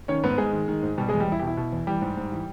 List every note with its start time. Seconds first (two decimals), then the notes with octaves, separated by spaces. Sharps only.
0.08 D#3 C#4 C#5
0.23 G#2 B3 B4
0.38 G#2 G#3 G#4
0.53 D#3
0.68 D#3
0.83 G#2
0.98 B2 G3 G4
1.08 E2 G#3 G#4
1.20 G3 G4
1.28 E2 E4
1.39 B2 G4
1.47 E4
1.57 B2
1.72 E2
1.87 E3 G3 G4
2.01 G#2
2.17 G#2
2.32 E3